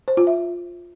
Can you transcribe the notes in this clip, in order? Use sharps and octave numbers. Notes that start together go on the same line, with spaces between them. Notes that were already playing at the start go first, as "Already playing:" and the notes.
C5
F4
E5